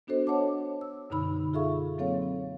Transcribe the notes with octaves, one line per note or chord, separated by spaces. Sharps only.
B3 D4 F#4 A4 C5 D#5
A4 C#5 F#5 A5 D6
E6
F#2 B2 D3 D#4 B5 E6
F4 G#4 A4 E5 F5 C#6
F#3 A#3 C4 A4 C#5 F5